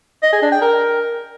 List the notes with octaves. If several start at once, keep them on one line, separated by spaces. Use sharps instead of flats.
D#5
G#4
D4
G5
A#4